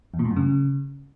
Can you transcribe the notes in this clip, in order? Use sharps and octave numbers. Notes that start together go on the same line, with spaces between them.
E2
A#2
A2
F#2
C#3